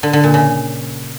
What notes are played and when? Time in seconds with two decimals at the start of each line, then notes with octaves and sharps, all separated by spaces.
0.03 D3
0.13 D3
0.24 A#2
0.34 C#3